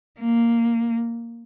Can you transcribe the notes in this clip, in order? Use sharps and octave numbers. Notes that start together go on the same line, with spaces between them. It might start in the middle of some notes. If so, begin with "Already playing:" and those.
A#3